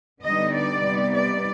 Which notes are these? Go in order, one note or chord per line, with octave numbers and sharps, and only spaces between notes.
D3 G3 B3 D#4 D#5
D5
C3 G3 B3 D#4
D5